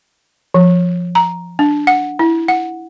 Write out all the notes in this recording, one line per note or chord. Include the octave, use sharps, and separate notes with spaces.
F3
A#5
D4
F#5
E4
F#5